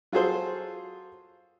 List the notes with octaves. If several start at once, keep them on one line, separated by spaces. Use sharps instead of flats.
F#3 F4 F#4 G#4 A4 C5